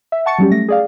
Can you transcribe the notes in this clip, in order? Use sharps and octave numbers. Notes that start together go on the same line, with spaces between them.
E5
F#5 A5 C#6 A6 C#7
F#3 G3 C#4 G4
A3 A#6
G#4 D5 F5